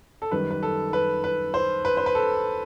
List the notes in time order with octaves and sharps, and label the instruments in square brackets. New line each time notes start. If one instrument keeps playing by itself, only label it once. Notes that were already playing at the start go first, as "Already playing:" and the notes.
[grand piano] A4
F#2 D#3 G3 B4
B4
A4
B4
B4
C5
B4
C5
B4
A4